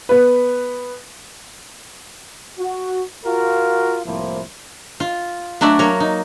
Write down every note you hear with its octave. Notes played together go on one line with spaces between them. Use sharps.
B3 B4
F#4
F4 F#4 A#4
C2 A2 F3 A#3 E4 C5
F4
F#3 A3 D4 F#4 D5 E5
F#3 A#3 A#4 C#5
D#4